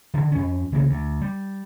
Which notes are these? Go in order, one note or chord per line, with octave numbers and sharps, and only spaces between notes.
D3 E3
F2 C#4
C2 C#3 E3 A#3
D2
G3